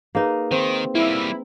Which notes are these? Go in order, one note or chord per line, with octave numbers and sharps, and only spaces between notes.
A#3 D#4 G#4 A#4 B4
D#3 C4
G3 A#3 E4